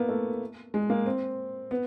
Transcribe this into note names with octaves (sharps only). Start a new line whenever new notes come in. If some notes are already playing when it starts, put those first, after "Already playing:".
Already playing: A#3 B3
A3
G#3
A#3
C4
B3